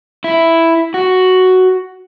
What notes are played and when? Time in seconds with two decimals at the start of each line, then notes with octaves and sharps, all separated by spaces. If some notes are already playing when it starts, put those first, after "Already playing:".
0.24 E4
0.94 F#4